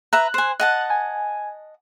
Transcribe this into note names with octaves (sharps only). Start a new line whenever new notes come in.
B4 E5 A#5 F#6
C5 G#5
D#5 F#5 A5 F#6
G#5